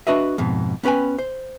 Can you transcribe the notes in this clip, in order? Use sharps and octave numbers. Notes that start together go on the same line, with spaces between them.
D4 F#4 B4 D#5 E5
F2 G#2 B2
B3 C#4 B4 G5 G#5
C5